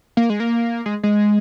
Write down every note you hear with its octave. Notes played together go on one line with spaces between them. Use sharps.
A#3
G#3
A#3
G#3
G#3